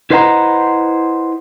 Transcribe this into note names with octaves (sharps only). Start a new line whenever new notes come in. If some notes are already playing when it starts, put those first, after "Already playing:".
E4 B4 C5 D#5 F#5 A#5